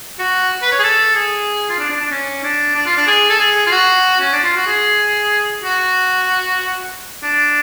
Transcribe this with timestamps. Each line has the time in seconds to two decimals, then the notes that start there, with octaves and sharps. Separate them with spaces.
0.19 F#4
0.62 B4
0.72 C#5
0.79 G#4
0.83 A4
1.15 G#4
1.70 F4
1.79 D4
1.90 D4
2.00 D4
2.11 C#4
2.44 D4
2.75 D4
2.86 F4
2.97 D4
3.07 G#4
3.30 A4
3.39 G#4
3.66 F4
3.72 F#4
4.20 C#4
4.33 D4
4.43 F4
4.56 F#4
4.67 G#4
5.64 F#4
7.23 D4